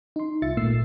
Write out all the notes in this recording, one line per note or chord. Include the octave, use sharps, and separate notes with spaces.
D#4 C6
C2 F4 E5 A6 C#7
G#1 A#2 A3 A#3 E6 C7